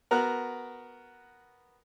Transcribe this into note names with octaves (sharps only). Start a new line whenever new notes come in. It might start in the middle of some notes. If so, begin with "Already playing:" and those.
B3 F#4 A#4 A#5 F#6